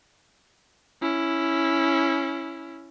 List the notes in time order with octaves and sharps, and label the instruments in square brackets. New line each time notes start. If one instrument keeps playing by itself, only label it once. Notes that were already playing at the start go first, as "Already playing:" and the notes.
[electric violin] C#4 E4